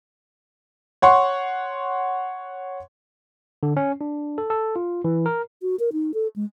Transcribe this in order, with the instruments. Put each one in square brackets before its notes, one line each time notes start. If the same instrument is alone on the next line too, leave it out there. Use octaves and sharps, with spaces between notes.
[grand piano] C#5 F#5 C6 C#6
[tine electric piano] D3
C#4
D4
A4
A4
F4
E3
A#4
[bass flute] F#4
A#4
D#4
A4
G#3